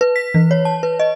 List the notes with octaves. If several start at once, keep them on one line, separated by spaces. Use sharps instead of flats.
B4
B6
E3
C#5
A5
B4
D#5